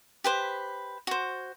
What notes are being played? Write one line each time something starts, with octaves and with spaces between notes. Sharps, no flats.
G4 B4 C5
F#4 C5